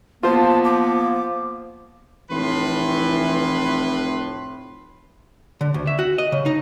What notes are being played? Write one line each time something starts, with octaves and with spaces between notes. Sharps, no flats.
F3 A#3 B3 F4 C5 A5
D6
F1 A2 E3 B4 C6
D3
D2
E5
F#4
D#5
C#3
D#4